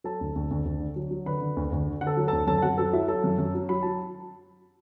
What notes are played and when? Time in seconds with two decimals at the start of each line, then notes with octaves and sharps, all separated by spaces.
0.04 F#3 A4 A5
0.21 D2
0.36 D2
0.51 D2
0.65 D2
0.80 D3
0.96 F#3
1.11 F#3
1.26 D3 B4 B5
1.41 D3
1.57 D2
1.72 D2
1.87 D3
2.01 D3 F#5
2.07 A4 A5
2.17 F#3
2.28 D2 A4 A5
2.47 F#2 A4 A5
2.58 A5
2.62 F#2 F#4 F#5
2.78 F#3 A4 A5
2.93 F#3 E4 E5
3.08 F#3 A4 A5
3.24 F#2
3.38 F#2
3.55 F#3
3.69 F#3 B5
3.83 F#3 A5